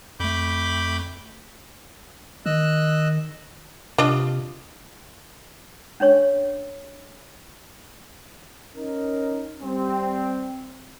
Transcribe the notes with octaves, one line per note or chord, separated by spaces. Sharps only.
F2 A3 B5 D6 G6
D#3 D#5 E6 F#6
C3 D4 F4 D#5
C#4 D4 C#5 C#6
C#4 D#4 A#4
G3 C4